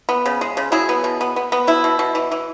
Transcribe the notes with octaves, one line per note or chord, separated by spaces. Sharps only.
B3
C#3
G#3
C#3
F#3 E4 G#4
B3
B2
B3
B3
B3
B2 E4
B2
B2
E3
E3